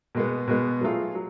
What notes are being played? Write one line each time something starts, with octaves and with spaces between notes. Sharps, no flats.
B2 G#3 B3
B2 G#3 B3
F#3 A3 F4 G#4
F#3